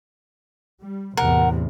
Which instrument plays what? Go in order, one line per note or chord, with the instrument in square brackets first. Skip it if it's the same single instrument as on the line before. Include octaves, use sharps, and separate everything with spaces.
[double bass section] G3
[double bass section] A1 E2 C3 [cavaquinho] A#4 F#5